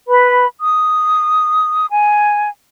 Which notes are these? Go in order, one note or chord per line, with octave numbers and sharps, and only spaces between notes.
B4 B5
D#6
G#5